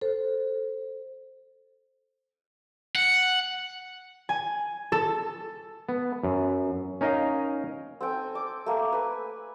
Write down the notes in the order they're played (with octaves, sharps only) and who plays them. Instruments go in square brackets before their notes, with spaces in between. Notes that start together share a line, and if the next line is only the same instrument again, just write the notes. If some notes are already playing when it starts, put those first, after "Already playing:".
[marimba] A4 C5
[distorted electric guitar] F#5
[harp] G#5
A4
[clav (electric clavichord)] B3
F#2
C#4 D#4 A#4 D#5 F5
[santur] C4 A4 G5 G#5
D6
A3 A#3 G#5
B4 G#5